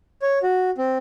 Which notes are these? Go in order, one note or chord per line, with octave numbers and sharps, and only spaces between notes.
C#5
F#4
C4